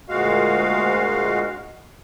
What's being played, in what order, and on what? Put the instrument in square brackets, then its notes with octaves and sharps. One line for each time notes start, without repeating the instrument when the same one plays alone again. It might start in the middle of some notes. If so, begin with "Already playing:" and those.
[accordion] D2 A#2 G#3 F#4 F5